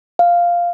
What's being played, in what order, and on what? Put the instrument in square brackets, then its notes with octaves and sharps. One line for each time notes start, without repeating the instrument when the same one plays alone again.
[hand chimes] F5